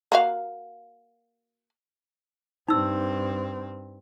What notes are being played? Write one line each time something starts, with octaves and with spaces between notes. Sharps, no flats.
A#3 F#4 F5
G2 C4 D#4 E6